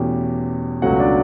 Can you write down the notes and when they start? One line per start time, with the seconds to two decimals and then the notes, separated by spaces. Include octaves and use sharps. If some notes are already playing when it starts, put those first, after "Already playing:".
Already playing: E2 B2 A3 C#4 G4
0.82 C#2 B2 F#3 A3 C#4 F#4 F#5
0.99 D4 D5